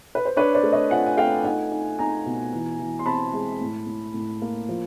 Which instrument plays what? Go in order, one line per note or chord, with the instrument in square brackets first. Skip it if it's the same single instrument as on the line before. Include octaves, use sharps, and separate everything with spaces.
[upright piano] B4
C5
D4 B4 C#5
C5 D5
A3
C#5 D#5
F4 F#5 G#5
G#5
A3 F5 G5
D#4 F#5 G#5
D#4
D#4 G#5 A#5
B2
E3
E3
C6
C4 A5 B5
G#3
A2
A2
A2
A#3
F3